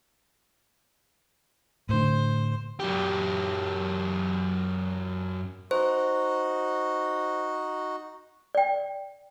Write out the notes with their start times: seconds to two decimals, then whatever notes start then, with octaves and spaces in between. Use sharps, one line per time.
1.89 A2 D3 C5
2.80 F#2 G4
5.71 D#4 F#4 C5
8.55 D5 G5